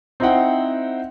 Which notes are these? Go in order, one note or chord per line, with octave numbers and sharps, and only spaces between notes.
C4 D#4 E4 C5 F#5 G5